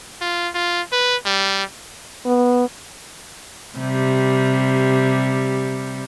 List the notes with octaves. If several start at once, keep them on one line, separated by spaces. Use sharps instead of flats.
F4
F4
B4
G3
B3
C3 G3